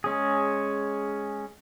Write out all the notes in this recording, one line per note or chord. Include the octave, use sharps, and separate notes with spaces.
G#3 C#4 G#4